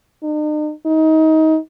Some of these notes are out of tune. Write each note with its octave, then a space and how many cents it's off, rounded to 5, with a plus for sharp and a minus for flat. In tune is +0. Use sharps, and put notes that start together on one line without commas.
D#4 -45
D#4 +25